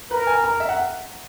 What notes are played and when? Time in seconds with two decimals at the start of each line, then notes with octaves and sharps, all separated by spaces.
0.11 A#4 B4
0.27 G#5
0.44 A#5
0.60 E5
0.69 F#5